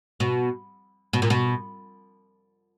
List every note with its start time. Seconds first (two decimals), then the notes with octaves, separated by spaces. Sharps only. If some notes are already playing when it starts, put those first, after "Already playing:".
0.20 B2
1.13 B2
1.22 A#2
1.30 B2